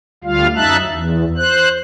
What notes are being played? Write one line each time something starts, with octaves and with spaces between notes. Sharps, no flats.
D2 G3 F4 F5
F#2 D#4 E5 A5 F#6
E2
C5 F#6